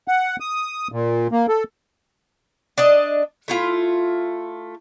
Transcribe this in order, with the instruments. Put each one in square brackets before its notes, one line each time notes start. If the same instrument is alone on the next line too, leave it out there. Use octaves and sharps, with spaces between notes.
[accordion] F#5
D#6
A#2
A#3
A4
[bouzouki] D4 D5 D#5
A3 E4 F4